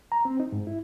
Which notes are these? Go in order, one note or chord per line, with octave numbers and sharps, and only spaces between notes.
A#5
C4
D#4
G#2
E4